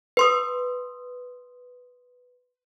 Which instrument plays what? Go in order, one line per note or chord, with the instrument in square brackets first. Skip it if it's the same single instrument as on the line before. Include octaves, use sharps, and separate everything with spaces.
[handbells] B4 C6 D#6